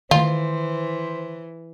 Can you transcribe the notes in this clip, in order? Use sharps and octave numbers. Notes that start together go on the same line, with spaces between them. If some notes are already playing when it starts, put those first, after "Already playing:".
D#3 E3 A3 F4 C5